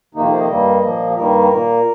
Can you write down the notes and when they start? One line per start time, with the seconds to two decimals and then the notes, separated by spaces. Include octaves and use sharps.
0.14 F2 C3 D#3 A#3 D#4
0.23 F4
0.31 C5
0.40 D#5
0.48 G2 G3 A#3
0.82 A#2 F3 A#3
1.09 G4
1.15 G2 D#3 G3 A#3 A#4
1.49 A#2 A#3